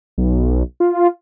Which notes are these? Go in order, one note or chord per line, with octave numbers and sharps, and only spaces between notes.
B1
F4